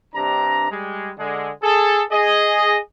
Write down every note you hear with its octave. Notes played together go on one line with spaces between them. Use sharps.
G2 C3 D4 A#5
G3 G#3
D3 G#3
G#4 A4
G#4 D#5